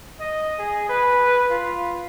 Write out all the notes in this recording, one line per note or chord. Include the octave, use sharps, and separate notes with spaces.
D#5
G#4
B4
F4